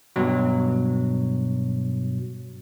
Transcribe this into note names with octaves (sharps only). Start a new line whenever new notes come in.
G2 B2 F#3